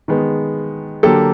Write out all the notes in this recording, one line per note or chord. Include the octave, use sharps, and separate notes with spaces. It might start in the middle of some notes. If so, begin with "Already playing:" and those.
D#3 G#3 B3
D3 F#3 A#3 G4 A4